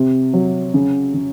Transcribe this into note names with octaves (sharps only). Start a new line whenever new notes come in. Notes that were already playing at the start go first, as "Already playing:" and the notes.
Already playing: C3
F#3
C#3
C#3